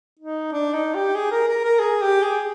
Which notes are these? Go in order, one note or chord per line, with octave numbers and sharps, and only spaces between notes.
D#4
D4
D#4
G4
G#4
A#4
A#4
A#4
G#4
G4
G#4